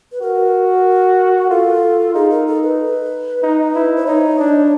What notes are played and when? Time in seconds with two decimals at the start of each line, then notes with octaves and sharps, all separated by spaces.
0.12 B4
0.21 F#4 A#4
1.50 F4 A4
2.14 D#4 G#4
2.30 A#4
2.47 A4
2.63 B4
3.42 D#4
3.75 E4
3.96 C5
4.06 D#4 C#5
4.39 D4